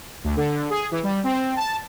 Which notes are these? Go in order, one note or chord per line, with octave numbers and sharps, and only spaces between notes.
D2
D3
G#4
E3
G3
C4
A5